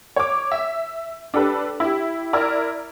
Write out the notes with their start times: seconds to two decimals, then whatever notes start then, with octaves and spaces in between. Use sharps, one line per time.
0.16 C#5 D6
0.52 E5
1.34 D4 G4 A4 B4
1.80 E4 G4
2.33 E4 A#4 D5